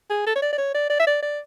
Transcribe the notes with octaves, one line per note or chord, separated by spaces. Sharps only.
G#4
A4
C#5
D5
D5
C#5
D5
D5
E5
D5
D5